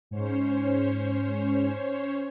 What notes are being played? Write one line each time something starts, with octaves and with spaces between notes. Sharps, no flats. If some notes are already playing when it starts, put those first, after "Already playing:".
G#2 C#4 C5 C#5